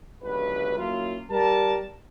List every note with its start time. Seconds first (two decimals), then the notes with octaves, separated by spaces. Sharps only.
0.23 G1 C#2 F#2 B4
0.77 F#3 A#3 C#4 E4 F4
1.31 G3 A#4 A5